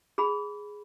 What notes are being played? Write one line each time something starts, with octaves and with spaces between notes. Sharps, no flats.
G#4 B5